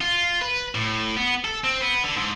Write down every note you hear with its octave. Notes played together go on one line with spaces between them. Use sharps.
F4
B4
A2
B3
A4
C4
B3
D3
G#2